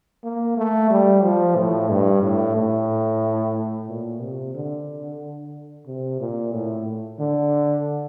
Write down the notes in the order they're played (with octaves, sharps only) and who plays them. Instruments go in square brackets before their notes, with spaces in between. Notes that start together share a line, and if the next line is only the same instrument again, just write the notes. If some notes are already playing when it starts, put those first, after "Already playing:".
[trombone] A#3
A3
G3
F3
A2
G2
A2
A2
A#2
C3
D3
C3
A#2
A2
D3